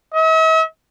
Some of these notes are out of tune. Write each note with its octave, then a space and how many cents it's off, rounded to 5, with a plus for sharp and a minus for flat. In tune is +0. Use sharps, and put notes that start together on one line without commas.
E5 -45